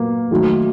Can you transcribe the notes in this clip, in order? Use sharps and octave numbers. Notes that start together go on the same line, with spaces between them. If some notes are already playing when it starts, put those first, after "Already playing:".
Already playing: A#2 F#3 A#3 B3
D#3 F#3 A3